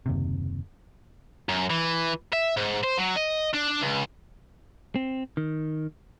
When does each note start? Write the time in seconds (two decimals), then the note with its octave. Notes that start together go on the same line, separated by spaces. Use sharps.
0.06 F#1 D#2 C3
1.49 F#2
1.70 E3
2.33 E5
2.57 G#2
2.83 C5
2.98 F#3
3.16 D#5
3.53 D4
3.81 C#2
4.96 C4
5.37 D#3